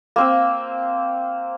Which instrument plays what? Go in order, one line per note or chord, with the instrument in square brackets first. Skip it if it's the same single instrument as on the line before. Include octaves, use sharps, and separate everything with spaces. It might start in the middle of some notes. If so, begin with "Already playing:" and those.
[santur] A#3 C4 E6